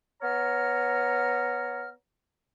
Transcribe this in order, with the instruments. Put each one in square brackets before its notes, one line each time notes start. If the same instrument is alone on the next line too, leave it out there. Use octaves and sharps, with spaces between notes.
[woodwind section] B3 C#5 A#5 F6